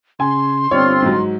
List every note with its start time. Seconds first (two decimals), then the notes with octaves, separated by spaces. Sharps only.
0.20 C#3 G#5 C6
0.71 G1 C4 F4 C#5 D5
1.02 G#2 F#3